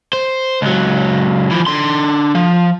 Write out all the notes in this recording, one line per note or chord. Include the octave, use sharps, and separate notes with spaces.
C5
C#2 F#3
E3 F3
D3 C6
F3